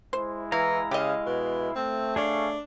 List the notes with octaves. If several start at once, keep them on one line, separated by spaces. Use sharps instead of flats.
G#3 E4 C5
E3 F5 A#5
C#3 G4 D#5 F5
B2
A3 C4
D4 G#4 C#5 F5